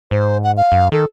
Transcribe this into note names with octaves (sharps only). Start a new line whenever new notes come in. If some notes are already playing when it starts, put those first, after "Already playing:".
G#2 C5
F#5
F5
F#2
D#3 A4